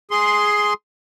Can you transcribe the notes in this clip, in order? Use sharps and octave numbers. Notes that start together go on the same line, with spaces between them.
G#4 C6